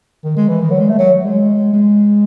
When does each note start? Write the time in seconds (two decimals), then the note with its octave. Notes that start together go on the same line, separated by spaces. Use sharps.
0.24 D#3
0.37 G#3
0.49 E3
0.61 D#3
0.71 F#3
0.80 G#3
0.89 A3
0.99 F#3
1.24 G#3
1.73 G#3